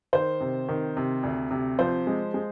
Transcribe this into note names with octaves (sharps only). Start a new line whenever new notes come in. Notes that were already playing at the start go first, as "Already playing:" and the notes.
D#3 C5
C3
D#3
C3
D2
C3
F3 C5
G#3
G#3